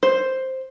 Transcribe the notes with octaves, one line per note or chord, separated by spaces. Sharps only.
C5